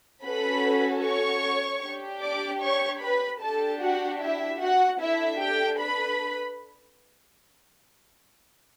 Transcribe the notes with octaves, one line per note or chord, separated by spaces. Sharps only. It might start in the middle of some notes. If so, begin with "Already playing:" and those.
C#4 F#4 A4 B4 B5
C#5 C#6
D4 G4
D5 D6
C#5 C#6
B4 B5
D4 G4 A4 A5
F#4 F#5
E4 E5
F#4 F#5
D4 E4 A4 E5
G4 G5
B4 B5